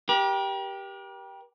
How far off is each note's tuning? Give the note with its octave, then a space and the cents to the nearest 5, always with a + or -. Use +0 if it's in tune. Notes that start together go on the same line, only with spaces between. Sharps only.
G4 +0 A#4 +45